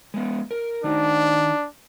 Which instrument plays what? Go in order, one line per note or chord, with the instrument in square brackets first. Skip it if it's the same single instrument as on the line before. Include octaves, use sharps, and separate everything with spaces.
[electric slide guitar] G#3 B3
A#4
[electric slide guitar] D#3 D#4 F#4 [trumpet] D4